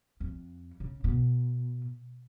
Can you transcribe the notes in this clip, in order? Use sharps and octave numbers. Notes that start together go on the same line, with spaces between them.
F2
C#3
B2